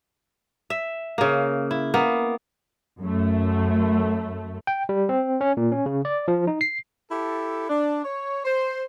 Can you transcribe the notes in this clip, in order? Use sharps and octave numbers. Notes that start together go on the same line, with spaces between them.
E5
C#3 A#3
E4
A#3 B3
F#2 A3
G5
G3
C4
C#4
A#2
C#4
C#3
D5
F3
D#4
C7
E4 G4 A4
D4
C#5
C5